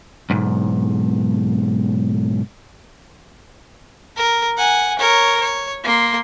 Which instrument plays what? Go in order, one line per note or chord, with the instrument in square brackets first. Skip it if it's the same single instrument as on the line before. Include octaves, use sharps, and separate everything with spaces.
[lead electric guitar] B1 G#2
[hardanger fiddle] A#4
F#5 G#5
A#4 C#5
C#5
A#3 C6